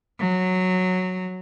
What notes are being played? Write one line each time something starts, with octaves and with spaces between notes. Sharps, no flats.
F#3